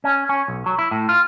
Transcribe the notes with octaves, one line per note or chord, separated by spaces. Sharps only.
C#4
C#4
B1
F#3
E4
A2
F4